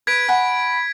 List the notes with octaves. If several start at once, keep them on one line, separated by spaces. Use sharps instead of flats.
B4 G#6 B6 D7
F#5 G#5 B5